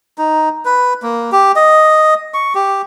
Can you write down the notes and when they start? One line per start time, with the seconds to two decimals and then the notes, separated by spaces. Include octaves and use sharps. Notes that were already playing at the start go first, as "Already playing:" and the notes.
0.18 D#4
0.65 B4
1.03 A#3
1.32 G4
1.56 D#5
2.34 C#6
2.55 G4